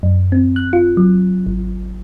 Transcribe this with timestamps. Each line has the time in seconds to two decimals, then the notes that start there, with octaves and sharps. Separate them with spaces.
0.03 F#2
0.32 C4
0.56 F#6
0.73 F4
0.97 F#3
1.46 G#1